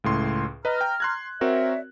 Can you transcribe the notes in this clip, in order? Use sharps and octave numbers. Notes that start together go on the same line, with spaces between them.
C#2 A2 C6
B4 D#5 A#5 F6
G5
C6 F#6 G#6
C4 F#4 A#4 C#5 D5 E5